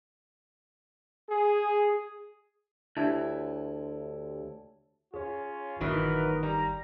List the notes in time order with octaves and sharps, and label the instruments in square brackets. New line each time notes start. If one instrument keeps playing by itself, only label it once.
[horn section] G#4
[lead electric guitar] D2 [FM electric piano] D4 G4 C#5 [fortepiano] E4 [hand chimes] A5
[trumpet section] C#4 F4 [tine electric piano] G#4 C#5
[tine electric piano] G1 [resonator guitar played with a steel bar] A#2 E3 F#3 [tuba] D#3 [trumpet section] A#4 B4 D#5
[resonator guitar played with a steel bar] G3 [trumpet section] A#5